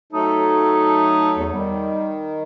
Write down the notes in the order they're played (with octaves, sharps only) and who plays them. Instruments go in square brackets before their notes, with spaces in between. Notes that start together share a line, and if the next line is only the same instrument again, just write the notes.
[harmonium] F#3 A3 A4 [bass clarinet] D#4
[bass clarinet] E2
[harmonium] D#3 [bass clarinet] G3